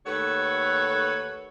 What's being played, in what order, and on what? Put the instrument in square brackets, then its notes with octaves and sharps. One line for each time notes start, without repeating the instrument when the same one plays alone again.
[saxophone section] D#2 A3 A4 B4 C#5 F#5